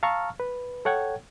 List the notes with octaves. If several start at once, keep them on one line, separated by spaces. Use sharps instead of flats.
F5 A5 A#5 C#6 E6 F6
B4
A4 C#5 F#5 G5 G#6